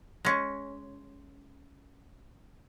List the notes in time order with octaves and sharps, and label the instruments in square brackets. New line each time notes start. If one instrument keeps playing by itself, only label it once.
[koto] G#3 C#4